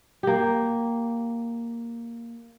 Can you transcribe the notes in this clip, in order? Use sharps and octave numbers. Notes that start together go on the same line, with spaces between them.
A#3 G4